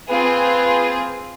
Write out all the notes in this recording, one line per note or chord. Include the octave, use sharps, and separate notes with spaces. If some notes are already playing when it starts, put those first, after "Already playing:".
C4 F4 G#4 B4